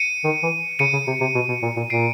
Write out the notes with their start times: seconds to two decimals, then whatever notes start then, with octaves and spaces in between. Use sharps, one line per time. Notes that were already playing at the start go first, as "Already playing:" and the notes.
Already playing: C#7 D#7
0.24 D#3
0.43 E3
0.79 C#3 C#7 D#7
0.93 C#3
1.07 C3
1.21 C3
1.35 B2
1.48 B2
1.63 A#2
1.77 A#2
1.90 A#2 C7 D7